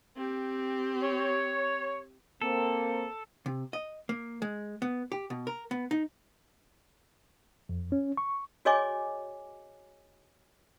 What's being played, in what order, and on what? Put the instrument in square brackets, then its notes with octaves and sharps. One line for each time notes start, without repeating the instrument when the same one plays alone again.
[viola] C4 G4
[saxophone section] C#5
[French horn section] A#3 C4 [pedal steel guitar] A4
[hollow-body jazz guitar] C3
D#5
A#3
G#3
B3
G4
B2
A#4
B3
D#4
[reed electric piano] F2
C#4
C#6
[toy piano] F#4 G#4 C#5 D#5 G#5 D6